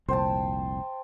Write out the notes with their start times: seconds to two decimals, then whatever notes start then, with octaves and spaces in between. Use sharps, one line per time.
0.08 F1 C2 A#2 C5 G5 A5